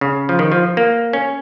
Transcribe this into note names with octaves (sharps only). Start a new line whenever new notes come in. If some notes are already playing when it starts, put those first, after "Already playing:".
C#3
F3
D#3
F3
A#3
C#4